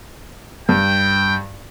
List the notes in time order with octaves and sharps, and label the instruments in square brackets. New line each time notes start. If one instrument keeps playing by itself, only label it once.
[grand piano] G2 [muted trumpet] G5